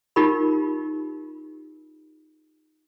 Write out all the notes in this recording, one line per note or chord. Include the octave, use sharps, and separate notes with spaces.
D#4 F4 G4 A#4 B5